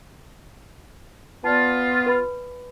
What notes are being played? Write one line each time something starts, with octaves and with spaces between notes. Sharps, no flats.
B3 F4 D5 A5
B4 B5